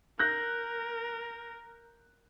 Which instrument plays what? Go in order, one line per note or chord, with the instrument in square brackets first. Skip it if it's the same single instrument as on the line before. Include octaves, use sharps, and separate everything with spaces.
[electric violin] A#4 [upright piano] F#6 G6 A#6